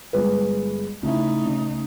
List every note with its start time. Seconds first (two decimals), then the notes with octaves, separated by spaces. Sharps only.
0.13 G1 G#3 B4
1.03 C#3 A3 D#4 E4
1.46 C#3